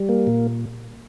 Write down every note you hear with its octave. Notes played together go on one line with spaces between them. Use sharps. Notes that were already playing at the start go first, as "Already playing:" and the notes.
Already playing: G3
A#3
A#2